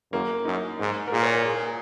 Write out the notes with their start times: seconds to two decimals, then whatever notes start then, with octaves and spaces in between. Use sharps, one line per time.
0.12 F#2 A#3
0.45 F#2 D#4
0.80 G#2
1.08 A#4
1.12 A#2 G#4
1.23 C#5
1.34 A#4
1.45 G#4